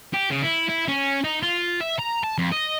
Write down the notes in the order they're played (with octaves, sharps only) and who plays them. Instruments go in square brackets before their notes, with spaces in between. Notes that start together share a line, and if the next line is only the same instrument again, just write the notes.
[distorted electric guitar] G4
C#3
E4
E4
C#4
D#4
F4
E5
A#5
A5
F2
D#5